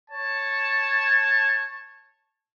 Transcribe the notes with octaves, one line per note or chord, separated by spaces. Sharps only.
C#5 A5